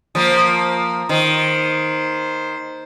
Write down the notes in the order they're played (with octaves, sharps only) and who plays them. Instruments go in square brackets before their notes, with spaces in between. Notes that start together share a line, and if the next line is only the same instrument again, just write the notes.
[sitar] F3 A#3
[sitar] D#3 [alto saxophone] C5